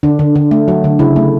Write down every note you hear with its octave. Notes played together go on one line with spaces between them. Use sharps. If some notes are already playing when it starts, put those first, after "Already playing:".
D3 D4
D3
D3
A3
F#3
D3
C#3 E4
A3